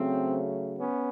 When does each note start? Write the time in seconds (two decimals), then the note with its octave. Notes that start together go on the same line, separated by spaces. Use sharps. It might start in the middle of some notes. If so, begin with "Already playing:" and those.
Already playing: C#3 F#3 A3 C4
0.79 B3 C#4